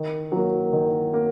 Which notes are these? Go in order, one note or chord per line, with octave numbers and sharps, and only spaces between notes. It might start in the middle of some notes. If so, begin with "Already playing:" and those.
Already playing: D#3
F#3 A#3
D#3
A#3